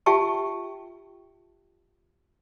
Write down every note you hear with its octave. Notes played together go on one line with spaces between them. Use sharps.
F4 G4 E5 G5 A5 C#6